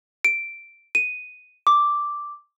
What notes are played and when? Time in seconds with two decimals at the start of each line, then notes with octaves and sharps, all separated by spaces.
0.25 D7
0.95 D#7
1.67 D6